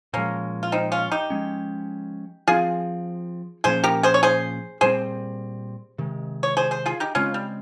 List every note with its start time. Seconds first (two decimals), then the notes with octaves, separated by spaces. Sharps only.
0.13 A#2 F3 G#3 A#3 C#4
0.63 F4
0.72 C4 D#4
0.92 C#4 F4
1.12 D#4 G4
1.30 F3 G#3 C#4
2.47 F3 C4 F4 G#4
3.64 A#2 F3 A#3 C#4 G#4 C5
3.84 G4 A#4
4.03 G#4 C5
4.14 C#5
4.23 G#4 C5
4.81 A#2 G3 C4 G#4 C5
5.98 C3 D#3 G#3
6.43 C#5
6.57 G#4 C5
6.71 G#4 C5
6.86 F4 G#4
7.00 D#4 G4
7.15 C#3 G#3 C4 C#4 F4
7.34 G3